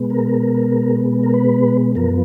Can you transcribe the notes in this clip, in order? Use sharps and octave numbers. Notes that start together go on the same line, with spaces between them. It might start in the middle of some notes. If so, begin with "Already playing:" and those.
Already playing: B2 G#3 B3
A#4
A#4
B4
F#2 F3 B3 A#4